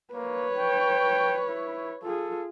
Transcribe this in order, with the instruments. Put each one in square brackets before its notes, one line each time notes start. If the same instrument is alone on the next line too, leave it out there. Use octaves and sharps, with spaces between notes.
[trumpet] A#3 [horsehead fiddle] B4 C#5
[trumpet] G5
E4
[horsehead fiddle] F4 G#4 [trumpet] A4